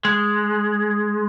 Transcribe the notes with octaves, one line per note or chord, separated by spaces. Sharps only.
G#3